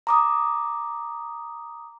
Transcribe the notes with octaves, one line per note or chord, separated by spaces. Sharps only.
A#5 D6 D#6